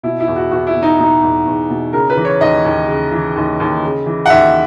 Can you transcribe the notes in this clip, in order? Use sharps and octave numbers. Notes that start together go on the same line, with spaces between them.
B2 E4
E4
E2
F#4
E2 F#4
E4
B2
D#4
B2 D#4
E2
E2
B2
C#3 A#4
B4
E3
C#5
D#2 D#5
D#2
C#3
E3
D#2
D#2
C#3
E3
F#5
D#2 E5